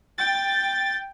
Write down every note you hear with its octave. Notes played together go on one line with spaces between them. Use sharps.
G5 A6